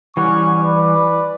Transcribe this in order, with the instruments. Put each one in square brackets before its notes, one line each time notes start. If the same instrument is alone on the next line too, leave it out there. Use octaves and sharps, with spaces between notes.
[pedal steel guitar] E3 G3 [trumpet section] C#4 F#5 C#6
[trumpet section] B4 D5